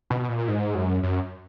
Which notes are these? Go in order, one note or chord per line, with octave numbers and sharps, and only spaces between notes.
B2
A#2
G#2
F#2
F#2